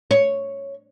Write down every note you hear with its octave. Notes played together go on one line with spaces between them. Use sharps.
C#5